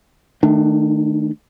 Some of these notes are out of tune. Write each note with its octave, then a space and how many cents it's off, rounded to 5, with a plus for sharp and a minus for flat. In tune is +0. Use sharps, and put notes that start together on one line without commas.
D#3 +0 A3 +0 D4 +30